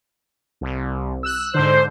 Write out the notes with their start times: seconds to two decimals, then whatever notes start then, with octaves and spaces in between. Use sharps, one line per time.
0.61 C2
1.23 E6 F#6
1.54 G#2 D3 C5